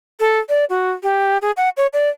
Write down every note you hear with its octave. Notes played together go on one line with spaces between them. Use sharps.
A4
D5
F#4
G4
G#4
F#5
C#5
D5